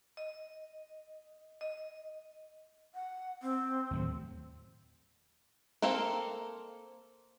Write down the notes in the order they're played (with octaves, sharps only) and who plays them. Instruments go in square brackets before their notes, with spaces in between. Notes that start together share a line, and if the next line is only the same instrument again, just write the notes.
[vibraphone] D#5
D#5
[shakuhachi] F#5
C4
[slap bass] D#2 A2 F#3
[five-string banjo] A#3 C4 A4 A#4 F5